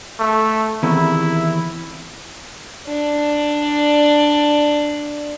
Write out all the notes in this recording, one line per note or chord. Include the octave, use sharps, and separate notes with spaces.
A3
E2 C3 D#3 E4
D4 D5